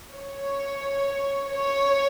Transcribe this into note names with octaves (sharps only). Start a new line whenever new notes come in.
C#5
C#5